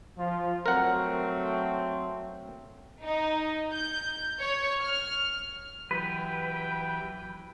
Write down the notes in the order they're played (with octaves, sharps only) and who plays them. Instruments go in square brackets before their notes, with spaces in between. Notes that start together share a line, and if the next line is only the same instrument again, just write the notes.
[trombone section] F3 F4
[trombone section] F#3 A3 C4 [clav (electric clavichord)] A#4 F#5
[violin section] D#4
G6
C#5
F6
[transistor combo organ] E3 F#3 G4 [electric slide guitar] B4 [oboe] G5